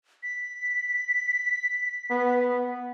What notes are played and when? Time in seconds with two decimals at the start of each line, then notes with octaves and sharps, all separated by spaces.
0.23 B6
2.11 B3